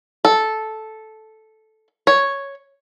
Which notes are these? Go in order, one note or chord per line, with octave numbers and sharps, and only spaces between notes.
A4
C#5